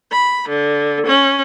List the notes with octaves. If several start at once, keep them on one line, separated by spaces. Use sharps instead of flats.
B5
D3
C#4